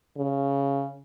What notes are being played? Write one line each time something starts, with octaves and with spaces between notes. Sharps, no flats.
C#3